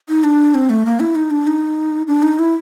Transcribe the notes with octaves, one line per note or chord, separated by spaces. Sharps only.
D#4
D4
C4
A3
A#3
E4
D#4
D4
D#4
D4
D#4
E4